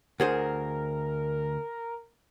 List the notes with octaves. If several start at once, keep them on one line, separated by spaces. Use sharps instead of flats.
D2 G#4 A#4 C5